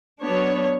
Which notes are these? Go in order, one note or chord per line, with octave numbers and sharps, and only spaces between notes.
F#3 B3 D4 C#5